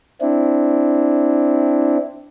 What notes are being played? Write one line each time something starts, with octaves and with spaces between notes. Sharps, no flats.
C4 D4 E4